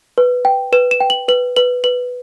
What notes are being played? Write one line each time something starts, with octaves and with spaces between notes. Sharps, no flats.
B4
G5
B4 E7
E7
G5
F#7
B4 F#7
B4 F#7
B4 F#7